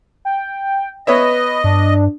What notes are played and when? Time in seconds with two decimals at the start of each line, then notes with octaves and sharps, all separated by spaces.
0.25 G5
1.07 B3 B4 C#5 D#5 E5
1.64 G2 D4